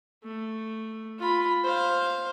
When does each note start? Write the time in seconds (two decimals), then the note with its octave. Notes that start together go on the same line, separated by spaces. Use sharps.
0.24 A3
1.19 F4 B5
1.64 C5 F5